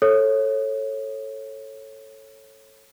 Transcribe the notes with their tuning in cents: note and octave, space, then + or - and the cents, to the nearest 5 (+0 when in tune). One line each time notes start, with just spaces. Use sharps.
A4 +0 C#5 -20